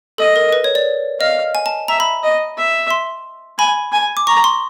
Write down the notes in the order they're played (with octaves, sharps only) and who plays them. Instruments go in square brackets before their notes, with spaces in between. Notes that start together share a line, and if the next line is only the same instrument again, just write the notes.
[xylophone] A4 [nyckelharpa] D#5
[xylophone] A#4
B4
C#5
D5
[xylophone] D#5 [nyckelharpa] F5
[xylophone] G#5
A5
[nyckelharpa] E5 [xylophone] A#5
[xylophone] B5
[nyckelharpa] D#5
E5
[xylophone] C6
[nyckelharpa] G#5 [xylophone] B5
[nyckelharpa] G#5
[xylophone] D6
[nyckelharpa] A#5 [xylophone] C#6
[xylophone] C6